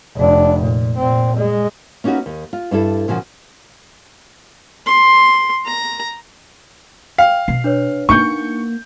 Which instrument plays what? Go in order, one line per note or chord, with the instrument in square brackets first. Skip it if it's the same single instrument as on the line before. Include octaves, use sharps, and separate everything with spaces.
[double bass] F1 D4
A#2
A#2 C4
G#3
[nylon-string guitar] A#3 C#4 D#4 F4 F#4 B4
D#2
F4
G2 D4 E4 A4
A#2 C#3 F3 F#4
[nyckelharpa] C6
A#5
[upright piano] F5 [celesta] G5
[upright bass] B2 [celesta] C7
[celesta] D4 B4 C#5
[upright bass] A#3 B3 [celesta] D4 D#4 C#7 [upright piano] C#6 G6